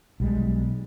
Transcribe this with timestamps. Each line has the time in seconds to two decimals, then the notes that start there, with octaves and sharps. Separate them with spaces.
0.20 B1 G3 G#3